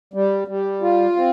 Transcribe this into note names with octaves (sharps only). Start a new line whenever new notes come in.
G3
G3
F4
C4